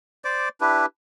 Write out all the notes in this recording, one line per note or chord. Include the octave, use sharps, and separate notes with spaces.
C5 D5 D6
D4 E4 G4 B4